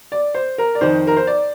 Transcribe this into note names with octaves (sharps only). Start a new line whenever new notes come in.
D5
C5
A#4
D5
F2 D#3 C5
A#4
C5
D5